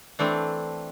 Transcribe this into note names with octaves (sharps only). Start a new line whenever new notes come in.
E3 A3 C4 D4